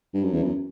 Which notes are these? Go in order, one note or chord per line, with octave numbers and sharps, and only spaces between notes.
G2
F#2
E2
F#2